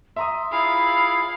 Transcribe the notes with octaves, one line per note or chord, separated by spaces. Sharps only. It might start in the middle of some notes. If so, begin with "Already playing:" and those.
E5 A#5 C6 D#6
E4 F4 G#4 F5 B5